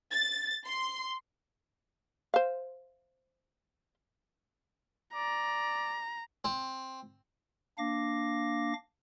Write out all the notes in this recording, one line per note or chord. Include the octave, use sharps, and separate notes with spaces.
A6
C6
C5 F5
D5 A#5
C4
A#3 D4 F5 D6 A#6